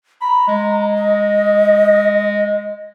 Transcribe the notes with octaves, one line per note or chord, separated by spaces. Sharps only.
A#5 B5
G#3
D#5